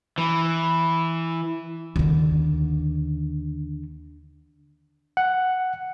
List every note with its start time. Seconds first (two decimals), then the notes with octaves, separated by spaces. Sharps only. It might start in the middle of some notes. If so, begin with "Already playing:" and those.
0.18 E3
1.96 D#2 D3
5.17 F#5